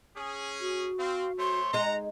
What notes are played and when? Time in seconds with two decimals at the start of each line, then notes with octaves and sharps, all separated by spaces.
0.17 C#4 G#4
0.61 F#4
0.99 C4 F5
1.38 A3 C5 C#5 C6
1.73 G#3 D#4 F#5 A#5